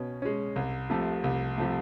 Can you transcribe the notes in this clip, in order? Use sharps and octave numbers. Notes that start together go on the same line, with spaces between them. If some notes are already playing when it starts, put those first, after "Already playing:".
Already playing: B2 C#4
G#3 C#4
C2
C3 F3 A3
C2
C3 F3 A3